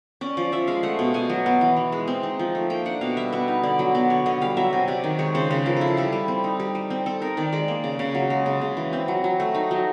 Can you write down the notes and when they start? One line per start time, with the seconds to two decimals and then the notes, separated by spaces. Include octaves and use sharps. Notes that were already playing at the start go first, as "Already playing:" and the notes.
0.21 C#4 D5
0.37 F3 D5
0.52 F3 E5
0.67 G#3 F5
0.83 A3 F#5
0.99 B2
1.14 B2 G#5
1.29 F#3
1.46 B3
1.61 E3
1.76 E3
1.92 G#3
2.08 C4
2.23 D#4
2.39 F3
2.55 A3
2.70 A#3 G5
2.85 D4 F#5
3.01 B2 F5
3.17 G3 E5
3.33 B3 E5
3.48 D#4
3.63 D3 D5
3.79 F#3
3.95 B3 D5
4.10 D3 C#5
4.26 D3 D#5
4.41 G3 F5
4.57 F#3 E5
4.73 C3
4.88 C3 D5
5.04 D#3
5.19 G#3 C#5
5.35 C#3 C5
5.50 C#3 B4
5.66 F3 A#4
5.76 E4 A4
5.87 G#4
5.97 G3 A4
6.13 G3
6.28 C4
6.44 D#4
6.60 G3
6.75 G3
6.90 C4
7.06 C4 A4
7.21 D#4 A#4
7.37 D#3 D5
7.53 G#3 D5
7.68 A#3
7.84 C#3
7.99 C#3
8.15 F#3
8.30 G#3
8.46 C#3
8.61 C#3
8.77 E3
8.93 C4
9.08 F#3
9.24 F#3
9.40 A3
9.55 D#4
9.71 F#3